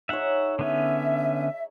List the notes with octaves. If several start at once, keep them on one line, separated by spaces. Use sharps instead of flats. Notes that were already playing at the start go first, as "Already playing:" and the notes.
D#4 G#4 C#5 E5 F#5
D3 B3 C#4 E5